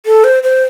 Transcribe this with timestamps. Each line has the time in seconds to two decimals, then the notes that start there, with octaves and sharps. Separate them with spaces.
0.06 A4
0.24 C5
0.43 C5